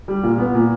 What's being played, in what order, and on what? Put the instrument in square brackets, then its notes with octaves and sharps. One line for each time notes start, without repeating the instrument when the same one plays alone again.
[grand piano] G3
A#2
B3
A#2